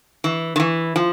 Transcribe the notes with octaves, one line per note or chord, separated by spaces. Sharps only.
E3
D#3
E3
F3